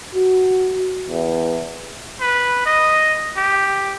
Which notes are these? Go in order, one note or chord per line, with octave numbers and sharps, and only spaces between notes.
F#4
E2
B4
D#5
G4